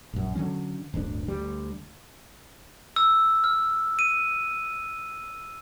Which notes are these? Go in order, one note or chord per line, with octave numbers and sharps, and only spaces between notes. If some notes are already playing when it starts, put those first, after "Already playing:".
A#1 F#2
D3 D#3 F#3 C#4
D1 G1 D2 D4
D2 G3
E6
F6
D#7